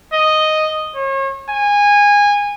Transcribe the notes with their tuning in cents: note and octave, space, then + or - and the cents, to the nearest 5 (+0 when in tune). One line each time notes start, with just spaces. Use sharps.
D#5 +0
C#5 -40
G#5 -20